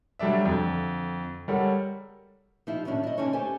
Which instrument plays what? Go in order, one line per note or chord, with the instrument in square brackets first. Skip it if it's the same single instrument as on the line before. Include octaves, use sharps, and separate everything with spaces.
[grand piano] F#3 G3 A3 D4 E5
F2 D3
G3 G#3 A4 A#4 C#5 F#5
[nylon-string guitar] F3 D#4 E4 G4
D#2 A2 F#3 C#4 D4
E4 D#5
G2 D3 C#4 D#4 C#5 A5
A3 G4 A4 C5 G#5